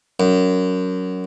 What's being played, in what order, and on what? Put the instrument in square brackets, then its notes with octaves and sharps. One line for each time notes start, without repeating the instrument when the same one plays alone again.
[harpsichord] F#2